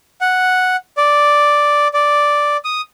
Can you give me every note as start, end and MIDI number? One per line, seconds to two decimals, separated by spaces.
0.21 0.76 78
0.97 1.88 74
1.93 2.57 74
2.64 2.81 87